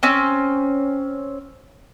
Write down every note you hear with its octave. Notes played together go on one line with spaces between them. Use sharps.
C4 C#4